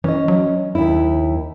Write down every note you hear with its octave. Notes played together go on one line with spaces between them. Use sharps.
E3 C#4 D#5
F#3
D#2 E4